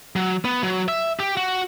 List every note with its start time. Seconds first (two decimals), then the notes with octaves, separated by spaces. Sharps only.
0.16 F#3
0.45 B3
0.63 F#3
0.88 E5
1.20 G4
1.37 F#4